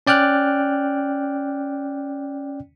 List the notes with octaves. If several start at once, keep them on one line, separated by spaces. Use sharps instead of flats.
C#4 D5 G5 F6 F#6